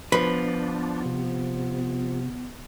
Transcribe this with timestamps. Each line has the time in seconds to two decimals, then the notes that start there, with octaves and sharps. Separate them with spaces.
0.12 F3 B3 D4 B4
1.05 C3